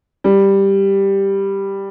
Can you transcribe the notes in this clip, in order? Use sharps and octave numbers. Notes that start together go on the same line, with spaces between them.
G3